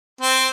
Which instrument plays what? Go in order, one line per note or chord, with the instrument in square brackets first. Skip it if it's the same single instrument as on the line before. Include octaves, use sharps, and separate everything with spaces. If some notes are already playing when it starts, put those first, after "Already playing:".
[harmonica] C4